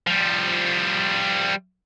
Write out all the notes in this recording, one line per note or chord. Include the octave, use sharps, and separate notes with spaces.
F3 G3